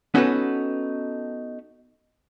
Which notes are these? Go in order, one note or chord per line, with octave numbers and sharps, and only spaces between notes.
B3 C#4 D#4 F#4 A4 B4